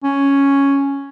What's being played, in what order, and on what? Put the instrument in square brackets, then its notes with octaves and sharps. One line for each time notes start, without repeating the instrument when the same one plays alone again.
[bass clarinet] C#4